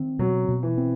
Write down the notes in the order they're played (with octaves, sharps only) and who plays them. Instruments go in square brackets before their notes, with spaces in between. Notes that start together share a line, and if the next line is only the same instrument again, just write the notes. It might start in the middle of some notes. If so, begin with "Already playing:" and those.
Already playing: [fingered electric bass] D#3 C4
[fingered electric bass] B2 [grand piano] F#3
[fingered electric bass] B2
[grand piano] E3
[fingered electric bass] C4